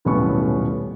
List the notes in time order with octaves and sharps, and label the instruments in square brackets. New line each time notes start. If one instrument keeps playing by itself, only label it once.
[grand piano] D#1 B1 A2 B3 C#4 C#6